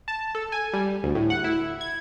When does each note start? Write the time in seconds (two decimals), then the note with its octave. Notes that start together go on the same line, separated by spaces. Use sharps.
0.08 A5
0.35 A4
0.52 G#5
0.73 G3
1.03 D2
1.15 A2
1.30 F#5
1.44 E4
1.81 G#6